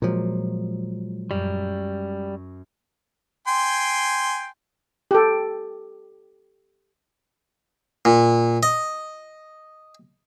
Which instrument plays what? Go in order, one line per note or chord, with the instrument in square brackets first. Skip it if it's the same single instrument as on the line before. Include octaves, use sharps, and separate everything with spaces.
[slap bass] A#2 F3 [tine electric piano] F#3 G#3
[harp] F#2 [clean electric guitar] G3
[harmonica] G5 G#5 C6
[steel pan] G4 A4
[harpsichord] A#2
D#5